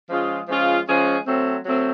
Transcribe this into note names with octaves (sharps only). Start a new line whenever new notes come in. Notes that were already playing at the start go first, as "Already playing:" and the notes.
F3 G#3 C#4 F4 G#4
F3 G#3 C#4 F4 G#4
F3 G#3 C#4 F4 G#4
F#3 A3 C4
F#3 A3 C4